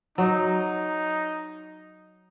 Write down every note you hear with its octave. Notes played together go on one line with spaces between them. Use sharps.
F#3 D#4